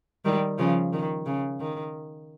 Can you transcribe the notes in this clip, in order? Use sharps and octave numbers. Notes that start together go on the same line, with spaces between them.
D#3 G3
C#3 F3
D#3
C#3
D#3